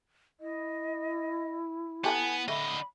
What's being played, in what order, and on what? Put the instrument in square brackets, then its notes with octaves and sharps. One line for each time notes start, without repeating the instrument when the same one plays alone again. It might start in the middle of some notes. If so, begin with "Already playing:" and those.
[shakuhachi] E4 [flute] D#5
[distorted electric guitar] B3 [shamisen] G4 A4 F#5 [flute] G#5
[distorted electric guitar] D3 D#5 [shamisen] A3 [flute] B5